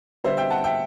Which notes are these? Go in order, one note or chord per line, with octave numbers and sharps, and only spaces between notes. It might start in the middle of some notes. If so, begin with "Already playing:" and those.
D3 G3 B3 C5 E5
E5 G5
F#5 A5
E5 G5